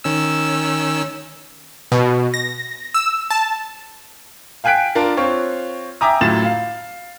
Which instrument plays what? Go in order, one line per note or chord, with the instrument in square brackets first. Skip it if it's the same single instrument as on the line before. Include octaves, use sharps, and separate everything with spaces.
[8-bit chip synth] D#3 C#4 E6
[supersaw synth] B2
A#6
E6
A5
[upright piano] F5 G5 G#5 F#6 B6 D7
D4 F4 A#4
C4 F4 C#5
E5 G5 G#5 A#5 D6 D#6
F#2 A2 F4 A6 E7
F5